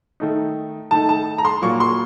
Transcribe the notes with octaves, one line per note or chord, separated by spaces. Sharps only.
D#3 A3 D#4
D#3 A3 D#4 A5
A5
A#5
C6
A#2 F#3 A#3 F4 C#6
C6